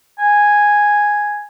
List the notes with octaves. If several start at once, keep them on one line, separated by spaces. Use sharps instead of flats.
G#5